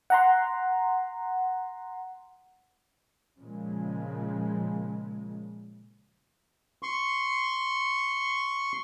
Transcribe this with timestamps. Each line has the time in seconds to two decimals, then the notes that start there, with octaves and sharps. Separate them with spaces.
0.10 F#5 A#5 C6
3.37 A#2 C#3 F3 G#3
6.83 C6 C#6